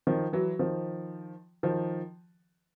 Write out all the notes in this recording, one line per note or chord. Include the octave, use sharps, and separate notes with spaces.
D#3 F3
E3 F#3
D#3 F3
D#3 F3